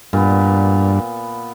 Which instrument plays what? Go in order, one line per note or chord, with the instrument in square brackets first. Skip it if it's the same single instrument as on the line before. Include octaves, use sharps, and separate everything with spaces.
[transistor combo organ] G2 [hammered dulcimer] A#2 B3